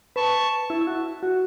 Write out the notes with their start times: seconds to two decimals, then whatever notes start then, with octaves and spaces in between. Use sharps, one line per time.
0.16 B4 A5 C#6
0.70 E4
0.81 E4
0.87 F#4
1.23 F#4